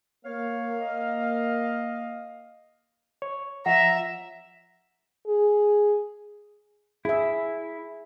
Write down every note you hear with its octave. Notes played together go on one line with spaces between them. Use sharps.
A#3 C#5 F5
D#5
C#5
F3 F4 E5 F#5 A#5
G#4
E4 G#4 E5